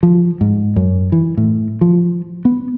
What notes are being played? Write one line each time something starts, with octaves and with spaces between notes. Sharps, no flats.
F3
G#2
F#2
E3
A2
F3
B3